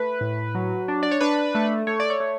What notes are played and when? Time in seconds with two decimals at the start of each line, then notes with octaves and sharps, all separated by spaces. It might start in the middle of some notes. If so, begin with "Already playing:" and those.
Already playing: A3 B4
0.21 A2
0.55 F#3
0.88 D4
1.03 D5
1.11 C#5
1.21 D4 B4
1.55 A3
1.87 A3 C#5
2.00 D5
2.10 C#5
2.20 A3